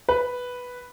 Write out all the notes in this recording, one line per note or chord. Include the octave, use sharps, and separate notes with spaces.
B4